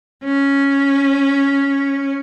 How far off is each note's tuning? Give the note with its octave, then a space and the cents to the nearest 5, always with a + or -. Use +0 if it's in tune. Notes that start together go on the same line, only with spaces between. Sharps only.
C#4 +0